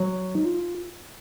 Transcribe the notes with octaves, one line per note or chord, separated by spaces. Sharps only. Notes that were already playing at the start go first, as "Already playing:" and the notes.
Already playing: F#3
D#4
F4